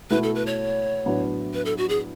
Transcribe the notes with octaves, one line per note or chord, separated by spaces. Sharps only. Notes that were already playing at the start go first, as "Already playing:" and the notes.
B2 A3 E4 B4
A4
B4
C#5
A2 F#3 B3 D4
B4
A4
F#4
G#4